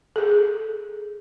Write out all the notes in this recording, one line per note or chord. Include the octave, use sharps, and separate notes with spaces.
G#4 A4